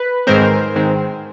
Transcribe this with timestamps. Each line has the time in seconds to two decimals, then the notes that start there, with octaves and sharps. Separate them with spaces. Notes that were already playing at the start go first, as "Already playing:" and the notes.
Already playing: B4
0.27 G#2 D#3 G#3 C4 A#4 C5
0.76 G#2 D#3 G#3 C4